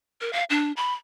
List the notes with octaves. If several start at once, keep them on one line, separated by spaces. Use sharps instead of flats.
A#4
F5
D4
B5